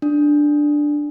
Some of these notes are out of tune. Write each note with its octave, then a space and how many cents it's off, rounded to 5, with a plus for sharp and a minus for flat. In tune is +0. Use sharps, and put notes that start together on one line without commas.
D4 +5